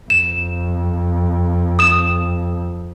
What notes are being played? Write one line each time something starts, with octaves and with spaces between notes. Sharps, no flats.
F2 E7
D#6 E7